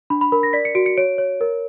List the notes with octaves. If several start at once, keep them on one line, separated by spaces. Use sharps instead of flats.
D4 B5
B5
A#4 B5
A#6
D5 B6
C#7
F#4 D7
C#7
C#5 D7
C#5
A#4